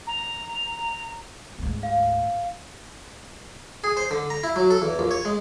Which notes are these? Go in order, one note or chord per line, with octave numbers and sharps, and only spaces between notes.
A#5
D2 G#2
F5
G#4
C5
D3
A#5
E4
F#3
A4
E2
A#1
C#5
G#3